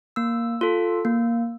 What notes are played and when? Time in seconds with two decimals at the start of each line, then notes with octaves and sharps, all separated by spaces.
0.16 A#3 E6
0.61 F4 A4
1.05 A#3